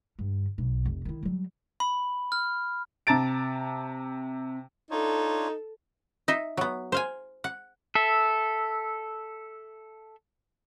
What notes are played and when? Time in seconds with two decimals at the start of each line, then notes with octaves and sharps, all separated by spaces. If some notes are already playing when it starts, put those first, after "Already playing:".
0.19 G2 D3
0.58 B1
0.85 F1
1.05 D#3 E4
1.23 F#3 G3
1.80 B5
2.32 F6
3.07 C3 A5 A#5 A6 D7
4.91 D4 D#4 F4 A4 C#5
6.28 D#4 D#5 E5
6.57 F#3 B3
6.92 C5 F5 G#5
7.44 F#5
7.95 A4 E5